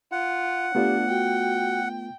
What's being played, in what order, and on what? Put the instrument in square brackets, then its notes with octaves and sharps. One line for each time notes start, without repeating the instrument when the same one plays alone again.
[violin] F4 [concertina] F#5
[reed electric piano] A3 B3 F4 [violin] D4 [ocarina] G4
[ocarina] F#4 [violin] G5